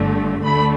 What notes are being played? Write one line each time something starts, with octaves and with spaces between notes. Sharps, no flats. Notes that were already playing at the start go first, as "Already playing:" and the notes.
Already playing: G1 G2 D3 A3
D2 D3 A3 B5